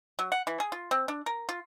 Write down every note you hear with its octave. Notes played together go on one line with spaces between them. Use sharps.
F#3
F#5
E3
G#4
F4
C4
D4
A#4
F4